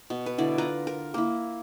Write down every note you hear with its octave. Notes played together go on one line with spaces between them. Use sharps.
B2
B4
D3 E4 D5
F4 B4 A#5
A#4
A#3 E4